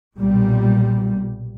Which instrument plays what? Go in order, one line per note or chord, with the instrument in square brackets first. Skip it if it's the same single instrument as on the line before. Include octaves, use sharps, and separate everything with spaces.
[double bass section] B1 A#2 G3